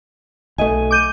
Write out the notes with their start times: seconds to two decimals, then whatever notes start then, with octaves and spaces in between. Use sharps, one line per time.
0.58 B1 A3 D#5 G#5
0.91 D6 G6 D#7